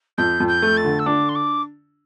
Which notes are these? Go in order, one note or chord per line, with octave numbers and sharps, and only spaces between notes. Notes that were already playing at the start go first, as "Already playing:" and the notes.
F2 G6
F2
G6
A3
A6
D3
E6
D4 D6
C6
D6